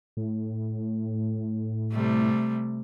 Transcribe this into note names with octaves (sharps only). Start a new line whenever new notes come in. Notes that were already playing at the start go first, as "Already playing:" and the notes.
A2
C3 G3 A3